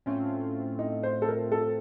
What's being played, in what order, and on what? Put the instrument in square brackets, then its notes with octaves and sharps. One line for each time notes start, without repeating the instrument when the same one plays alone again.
[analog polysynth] A2 A3 C4 F4 [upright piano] C#4
[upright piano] D#4
C5
A4
A#4
A4